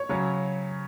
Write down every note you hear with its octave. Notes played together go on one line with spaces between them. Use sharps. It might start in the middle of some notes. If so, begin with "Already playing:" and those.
Already playing: C#5
C#3 F#3 C#4